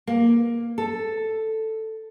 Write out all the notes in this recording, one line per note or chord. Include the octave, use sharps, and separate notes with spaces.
A#3
A4